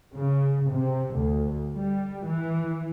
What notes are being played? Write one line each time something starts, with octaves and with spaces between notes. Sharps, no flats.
C#3
C3
D2
G3
E3